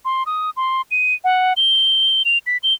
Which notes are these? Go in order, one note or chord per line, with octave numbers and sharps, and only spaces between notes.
C6
D#6
C6
D#7
F#5
G7
F7
B6
G7